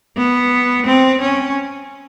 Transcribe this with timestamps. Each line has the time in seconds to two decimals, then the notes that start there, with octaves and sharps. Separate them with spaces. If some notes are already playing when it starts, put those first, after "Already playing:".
0.17 B3
0.87 C4
1.21 C#4